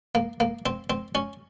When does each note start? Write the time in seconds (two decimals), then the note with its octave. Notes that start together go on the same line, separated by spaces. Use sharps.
0.15 A#3
0.40 A#3
0.66 C4
0.90 C4
1.15 C#4